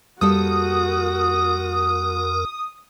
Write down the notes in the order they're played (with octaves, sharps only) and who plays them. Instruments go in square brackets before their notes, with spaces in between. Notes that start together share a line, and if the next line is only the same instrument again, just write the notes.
[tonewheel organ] F2 A#4 [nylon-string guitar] G3 A#3 A4 [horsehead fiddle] F#4 [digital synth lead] D#6